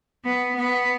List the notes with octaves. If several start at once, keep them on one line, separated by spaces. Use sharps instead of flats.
B3
B3